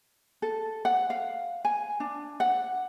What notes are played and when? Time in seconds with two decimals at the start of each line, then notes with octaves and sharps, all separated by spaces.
0.42 A4
0.85 F#5
1.10 F5
1.65 G#5
2.00 D4
2.40 F#5